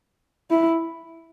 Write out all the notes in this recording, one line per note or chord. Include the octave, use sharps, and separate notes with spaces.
E4